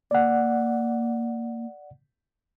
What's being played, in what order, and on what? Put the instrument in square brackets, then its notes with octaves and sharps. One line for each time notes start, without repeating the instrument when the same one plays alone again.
[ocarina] A#3 [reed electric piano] D5 F#5